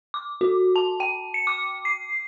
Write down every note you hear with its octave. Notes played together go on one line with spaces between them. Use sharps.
D6
F#4
A5
G5
C#7
D6
C7